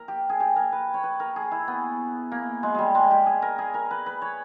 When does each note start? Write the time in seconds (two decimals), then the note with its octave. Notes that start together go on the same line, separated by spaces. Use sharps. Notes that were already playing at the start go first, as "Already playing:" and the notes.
Already playing: A#4
0.08 G4
0.29 G#4
0.40 G4
0.56 A#4
0.72 B4
0.94 C#5
1.03 B4
1.20 A#4
1.36 G#4
1.51 E4
1.68 B3
2.32 A#3
2.63 G#3
2.74 G3 G#3
2.95 G#3
3.11 G4
3.26 G#4
3.42 A#4
3.58 G#4
3.74 A#4
3.91 B4
4.06 B4
4.22 C#5